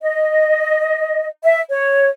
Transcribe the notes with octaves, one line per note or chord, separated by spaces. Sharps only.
D#5
E5
C#5